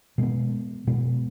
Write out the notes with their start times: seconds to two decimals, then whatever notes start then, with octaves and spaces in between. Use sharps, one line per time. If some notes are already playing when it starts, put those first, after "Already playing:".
0.18 B2 G#3 B3
0.87 B2 G#3 B3